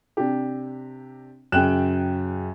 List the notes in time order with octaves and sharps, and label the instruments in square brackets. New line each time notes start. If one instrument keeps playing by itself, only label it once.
[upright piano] C3 D4 G4
[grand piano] F#2 E7 [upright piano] C#3 G5 F#6